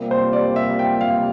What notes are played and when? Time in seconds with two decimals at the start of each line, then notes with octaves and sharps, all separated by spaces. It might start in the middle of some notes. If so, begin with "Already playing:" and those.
Already playing: C3 G3 A#3 F4
0.11 C5
0.33 D5
0.56 E5
0.79 G5
1.01 F5